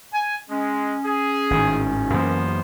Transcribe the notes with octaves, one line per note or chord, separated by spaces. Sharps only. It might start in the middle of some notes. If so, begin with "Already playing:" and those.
G#5
G#3 C#4
G#4
G#1 A2 D#3
F#2 E3 F3 A#3 B3 C5